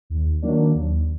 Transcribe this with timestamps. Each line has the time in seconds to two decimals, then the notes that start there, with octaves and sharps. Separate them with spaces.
0.10 D#2
0.42 D#3 F#3 A#3 D4
0.75 D#2